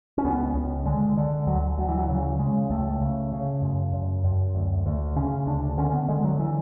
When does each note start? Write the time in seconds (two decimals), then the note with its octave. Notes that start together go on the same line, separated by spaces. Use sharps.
0.18 C#4
0.24 C#2 B3
0.55 C#2
0.85 D3 G#3
1.17 D3
1.47 D2 F#3
1.78 D2 F#3
1.88 E3
1.98 F#3
2.09 C#3 E3
2.39 C#3 G#3
2.70 C#2 A3
3.01 C#3
3.32 C#3
3.62 F#2
3.93 F#2
4.24 F#2
4.55 D2
4.86 D2
5.16 C#3 C#4
5.47 D2 D4
5.78 D3 C#4
5.93 B3
6.08 D3 G#3
6.24 F#3
6.40 E3